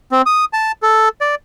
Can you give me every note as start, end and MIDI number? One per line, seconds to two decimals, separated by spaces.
0.12 0.22 60
0.26 0.45 87
0.53 0.72 81
0.83 1.09 69
1.21 1.35 74